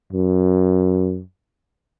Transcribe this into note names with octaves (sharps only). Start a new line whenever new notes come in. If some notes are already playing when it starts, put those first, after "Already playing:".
F#2